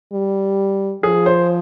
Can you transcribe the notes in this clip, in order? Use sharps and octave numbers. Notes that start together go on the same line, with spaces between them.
G3
F3 G#4
C5